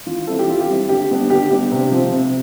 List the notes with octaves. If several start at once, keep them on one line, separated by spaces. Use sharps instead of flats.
E3 F4
G3 C4 E4 A4
G4
E3 F4
G4
G3 C4 E4
D3 G4
G3 B3 D4
D3 G4
G3 B3 D4 G4
C3
F3 C4
C3